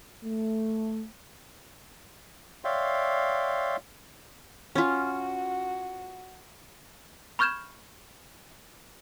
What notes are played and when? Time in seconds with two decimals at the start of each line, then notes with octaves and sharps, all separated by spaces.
0.23 A3
2.64 C#5 D5 E5 F5 G5 C6
4.75 C#4 F4 F#4
7.39 B5 C#6 F6 G6 G#6 E7